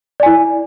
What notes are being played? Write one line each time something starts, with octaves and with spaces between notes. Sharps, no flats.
E4 D5 G#5